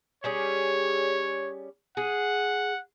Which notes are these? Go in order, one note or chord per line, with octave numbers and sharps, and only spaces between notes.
G3 C#4 G#4 C#5
G#4 F#5